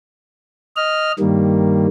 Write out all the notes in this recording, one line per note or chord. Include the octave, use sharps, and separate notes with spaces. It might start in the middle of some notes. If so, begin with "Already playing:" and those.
D#5 F6
G2 D#3 G3 A#3